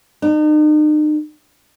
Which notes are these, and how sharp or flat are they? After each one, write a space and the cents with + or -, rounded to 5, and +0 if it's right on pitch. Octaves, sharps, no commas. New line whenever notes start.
D#4 -40